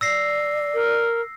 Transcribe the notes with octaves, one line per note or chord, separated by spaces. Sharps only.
D5 E6 A#6 C7
A#4